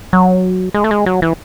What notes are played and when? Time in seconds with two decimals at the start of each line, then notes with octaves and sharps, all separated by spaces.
0.13 F#3
0.74 G#3
0.84 A3
0.91 G#3
1.06 F#3
1.22 E3